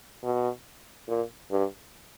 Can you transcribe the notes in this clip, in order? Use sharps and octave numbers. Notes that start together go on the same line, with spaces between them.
B2
A#2
G2